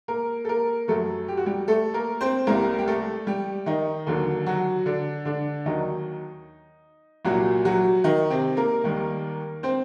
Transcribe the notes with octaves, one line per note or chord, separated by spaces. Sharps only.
A#3 A#4
A4
A#3 A#4
F#2 F#3 A3 A4
G4
F#4
G3 G4
A3 A4
A#3 A#4
C4 C5
C2 C3 G3 A#3 A#4
G4
A3 A4
G3 G4
D#3 D#4
D#2 D3 F#3 A#3
F#3 F#4
D3 D4
D3 D4
D#2 D#3 F#3 D#4
C2 A#2 F#3 G3 F#4
F#3 F#4
D#3 D#4
C3 C4
A#3 A#4
D#2 D#3 G3
C4 C5